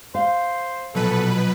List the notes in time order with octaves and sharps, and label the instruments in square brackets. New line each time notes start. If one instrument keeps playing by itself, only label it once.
[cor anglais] C5 [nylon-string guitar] F5
[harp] A#1 F#3 [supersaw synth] B2 B4 [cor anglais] A4